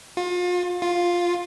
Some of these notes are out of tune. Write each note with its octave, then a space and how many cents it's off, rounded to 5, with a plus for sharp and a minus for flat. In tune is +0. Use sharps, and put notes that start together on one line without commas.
F4 +35
F4 +5